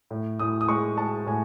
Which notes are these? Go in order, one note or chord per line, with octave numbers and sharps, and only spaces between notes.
A2
A2 D#6
D#6
G#3 C#6
G#3 A5
A2 G#5